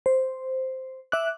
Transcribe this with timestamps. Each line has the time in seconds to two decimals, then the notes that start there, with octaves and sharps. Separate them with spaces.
0.06 C5
1.12 E5 D6 F#6